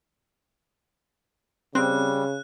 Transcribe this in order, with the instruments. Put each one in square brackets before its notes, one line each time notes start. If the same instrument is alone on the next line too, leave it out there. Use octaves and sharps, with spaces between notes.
[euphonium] C#3 [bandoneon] G3 [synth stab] C4 [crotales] F#6